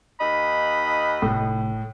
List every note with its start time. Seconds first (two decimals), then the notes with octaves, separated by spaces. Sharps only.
0.20 D#2 D#4 D#5 B5
1.22 F1 A2